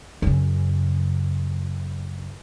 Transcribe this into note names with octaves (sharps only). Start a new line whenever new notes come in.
F#2 C#3